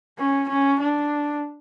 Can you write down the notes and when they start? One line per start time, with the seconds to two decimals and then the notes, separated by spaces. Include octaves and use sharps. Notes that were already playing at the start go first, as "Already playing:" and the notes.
0.18 C#4
0.49 C#4
0.80 D4